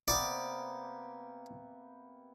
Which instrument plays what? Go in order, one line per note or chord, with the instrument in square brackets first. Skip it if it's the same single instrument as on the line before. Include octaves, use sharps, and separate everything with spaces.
[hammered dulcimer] C3 A#3 B3 [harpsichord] D5 D6